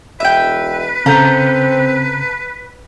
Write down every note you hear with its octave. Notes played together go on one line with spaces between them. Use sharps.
E1 B4 E5 G5
C#3 C4 A4 F5 A#5 G6